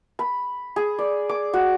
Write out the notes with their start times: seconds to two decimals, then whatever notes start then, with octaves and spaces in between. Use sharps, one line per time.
0.19 B5
0.76 G#4
0.99 D5
1.29 D6
1.53 F#4